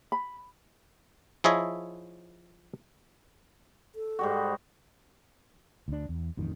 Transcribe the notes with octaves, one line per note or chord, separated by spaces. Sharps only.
B5
F3 E4 G#4 C#5 D#5 E5
A4
G#2 G3 F#4
D2 D4
E2
A1 F2 D#3